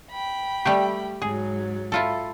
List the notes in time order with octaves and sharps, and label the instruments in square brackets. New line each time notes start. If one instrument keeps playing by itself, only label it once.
[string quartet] G5 B5
[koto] G3 A3 G4
[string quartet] G#2 F#3 [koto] G#4
[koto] E4 F4 A4